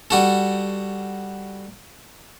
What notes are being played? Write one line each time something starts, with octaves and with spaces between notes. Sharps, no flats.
G3 F#4 A4